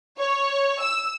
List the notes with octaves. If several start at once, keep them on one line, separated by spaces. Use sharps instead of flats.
C#5
E6